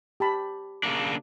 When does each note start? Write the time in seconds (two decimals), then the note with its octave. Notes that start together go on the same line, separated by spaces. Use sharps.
0.20 G4 A5 B5
0.83 C#3 A#3 D4